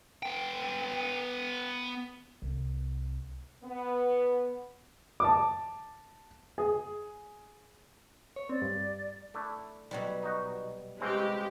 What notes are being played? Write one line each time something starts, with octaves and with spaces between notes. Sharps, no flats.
B3 G5
C2
B3
A5 D6
G#4
C#5
C4 D5
G2
A3 D4 E4
B2 F#3 G3
D#4 F#4
C#3 E3 G#3 C4 G4